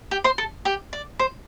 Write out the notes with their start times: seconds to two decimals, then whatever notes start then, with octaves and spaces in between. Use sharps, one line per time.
0.11 G4 G5
0.24 C5 C6
0.38 A4 A5
0.65 G4 G5
0.93 D5
1.19 C5